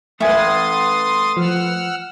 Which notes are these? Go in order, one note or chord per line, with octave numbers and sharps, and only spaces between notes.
A3 E4 B4 D5 G#5 C6 D#6 A6
F3 F#5 E6 F6